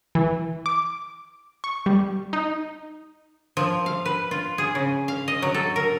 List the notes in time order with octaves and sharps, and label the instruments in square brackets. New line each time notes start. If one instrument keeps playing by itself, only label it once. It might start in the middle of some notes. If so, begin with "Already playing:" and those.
[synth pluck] E3
D6
C#6
G3
D#4
[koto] F3
F5
B4
F4
G#4
C#3
F5
D#5
F#3
A4
A#4